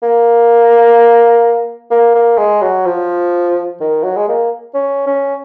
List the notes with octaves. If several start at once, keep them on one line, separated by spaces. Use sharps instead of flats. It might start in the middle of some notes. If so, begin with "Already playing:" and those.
A#3
A#3
A#3
G#3
F#3
F3
D#3
F#3
G#3
A#3
C#4
C#4